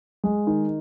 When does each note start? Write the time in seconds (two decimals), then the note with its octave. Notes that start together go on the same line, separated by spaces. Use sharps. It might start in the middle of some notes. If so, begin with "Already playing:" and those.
0.24 G#3
0.47 D#3